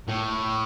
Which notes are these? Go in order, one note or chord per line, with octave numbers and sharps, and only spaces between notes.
A2